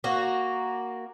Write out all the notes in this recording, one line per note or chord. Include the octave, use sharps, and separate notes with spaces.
A#3 F#4